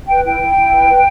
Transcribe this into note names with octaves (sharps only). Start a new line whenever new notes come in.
B4 G5
E4 G5
E4
E4
B4
B4